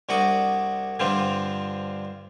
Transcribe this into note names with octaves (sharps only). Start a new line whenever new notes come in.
C2 D4 F#4 F#5 D6 D#6
G2 D3 F3 C4 D4 F4